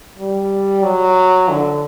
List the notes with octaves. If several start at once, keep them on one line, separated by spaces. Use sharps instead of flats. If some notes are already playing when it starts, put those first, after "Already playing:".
G3
F#3
D3